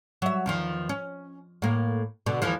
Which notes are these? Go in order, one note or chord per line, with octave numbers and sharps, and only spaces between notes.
F#3 E5
E2 D#3 F3
C#4
A2 A#3
B2 D3
D#2 E3 F3